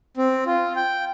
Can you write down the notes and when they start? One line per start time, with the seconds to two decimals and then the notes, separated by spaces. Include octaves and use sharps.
0.17 C4
0.46 F4
0.76 G5